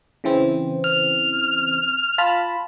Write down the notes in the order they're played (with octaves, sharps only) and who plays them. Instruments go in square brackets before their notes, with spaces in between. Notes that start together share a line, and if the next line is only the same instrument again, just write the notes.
[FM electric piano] C#3 E3 C4
[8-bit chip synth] F6
[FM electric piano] F4 A5 B5